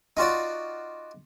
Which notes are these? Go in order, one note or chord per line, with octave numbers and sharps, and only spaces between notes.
D#4 F4 F#4 D5